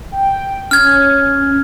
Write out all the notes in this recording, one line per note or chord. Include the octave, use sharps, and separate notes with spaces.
G5
C#4 F6 G#6